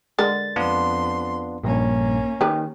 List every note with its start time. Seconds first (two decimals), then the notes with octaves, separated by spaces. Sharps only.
0.19 D3 G#3 A#4 A6
0.56 F2 B3 D4 F4 C6
1.64 A#1 G2 A#3 C#4
2.41 D#3 G4 B4